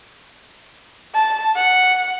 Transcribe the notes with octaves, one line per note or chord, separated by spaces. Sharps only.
A5
F#5